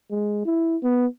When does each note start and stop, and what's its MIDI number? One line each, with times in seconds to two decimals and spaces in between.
0.11 0.43 56
0.45 0.77 64
0.83 1.06 59